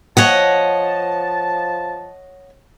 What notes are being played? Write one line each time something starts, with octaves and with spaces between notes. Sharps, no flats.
F3 C#5 D#5 F#5 A5